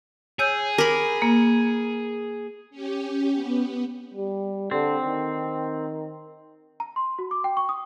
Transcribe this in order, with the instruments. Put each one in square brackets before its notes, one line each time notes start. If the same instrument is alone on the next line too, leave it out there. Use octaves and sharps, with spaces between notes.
[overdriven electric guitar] G#4 [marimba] C#5 E6 G6
[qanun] A#4 B5 [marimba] D6
[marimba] A#3
[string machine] C#4 G4
B3
[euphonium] G3
[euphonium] D3 [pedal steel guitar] C4
[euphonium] D#3
[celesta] A#5
C6
F#4
D6
G5
C#6
D#6